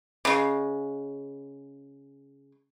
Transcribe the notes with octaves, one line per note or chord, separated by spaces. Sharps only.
C#3 G#3